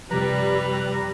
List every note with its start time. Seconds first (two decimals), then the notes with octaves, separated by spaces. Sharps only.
0.11 F#2 C3 F3 G3 B4 A#5